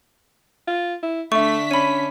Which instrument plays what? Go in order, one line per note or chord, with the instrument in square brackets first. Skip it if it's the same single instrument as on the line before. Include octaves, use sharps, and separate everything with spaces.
[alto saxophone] F4
E4
[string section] D3 D4 B6 [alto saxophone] A3 [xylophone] E5 C#6
[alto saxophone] C#4 [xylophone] B5 D#7